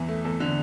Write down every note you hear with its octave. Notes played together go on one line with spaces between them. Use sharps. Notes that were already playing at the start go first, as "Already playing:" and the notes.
Already playing: E2 E3
A3
E2 A4
D3